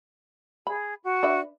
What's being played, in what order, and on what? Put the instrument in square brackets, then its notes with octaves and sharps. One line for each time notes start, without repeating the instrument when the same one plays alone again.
[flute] G#4 [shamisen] B5
[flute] F#4
[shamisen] D4 B4 E5